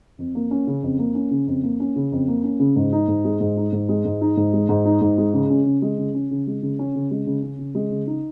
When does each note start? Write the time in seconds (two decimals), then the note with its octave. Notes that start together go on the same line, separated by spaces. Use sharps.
0.18 F2
0.35 A#3
0.51 C#4
0.67 C#3
0.83 F2
0.99 A#3
1.15 C#4
1.31 C#3
1.47 F2
1.63 A#3
1.80 C#4
1.96 C#3
2.12 F2
2.28 A#3
2.43 C#4
2.60 C#3
2.76 G#2
2.92 D#4
3.08 G#2
3.25 G#3
3.41 G#2
3.57 D#4
3.73 G#2
3.89 G#3
4.05 G#2
4.21 D#4
4.37 G#2
4.53 G#3
4.69 G#2
4.85 D#4
5.01 G#2
5.18 G#3
5.34 C#3
5.50 C#4
5.66 C#3
5.82 G#3
5.98 C#3
6.14 C#4
6.31 C#3
6.47 G#3
6.62 C#3
6.79 C#4
6.95 C#3
7.11 G#3
7.27 C#3
7.42 C#4
7.59 C#3
7.75 G#3
7.91 C#3
8.07 D#4